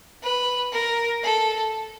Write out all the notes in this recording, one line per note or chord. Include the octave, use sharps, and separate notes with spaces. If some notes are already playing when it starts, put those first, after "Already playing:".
B4
A#4
A4